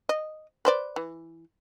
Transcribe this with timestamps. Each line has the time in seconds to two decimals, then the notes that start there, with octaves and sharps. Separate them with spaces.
0.09 D#5
0.65 B4 C5 D5
0.96 E3